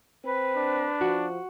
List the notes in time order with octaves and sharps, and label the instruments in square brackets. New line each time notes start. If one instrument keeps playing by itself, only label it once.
[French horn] C4 [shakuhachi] B4
[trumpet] D4
[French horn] F3 [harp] F#4